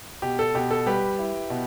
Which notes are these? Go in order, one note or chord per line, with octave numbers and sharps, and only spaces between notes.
B2 G4
A4
B2 G4
A4
G3 G4 B4
E4
B2